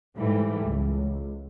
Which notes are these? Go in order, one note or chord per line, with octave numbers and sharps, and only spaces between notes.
G#2 E3 G3 A3
C#2